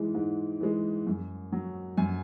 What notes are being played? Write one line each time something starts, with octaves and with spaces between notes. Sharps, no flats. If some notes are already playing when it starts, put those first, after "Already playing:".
Already playing: G#2 E3 G#3
G#2
E3 G#3
F#2
F#3
F#2 G#5